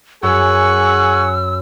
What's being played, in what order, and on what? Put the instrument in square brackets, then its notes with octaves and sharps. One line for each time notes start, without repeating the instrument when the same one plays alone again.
[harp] F#2 [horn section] G#4 F#5 G#5 [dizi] C#6 [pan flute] E6